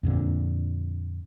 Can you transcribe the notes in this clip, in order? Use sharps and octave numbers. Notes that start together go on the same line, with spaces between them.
F2 A#2 D3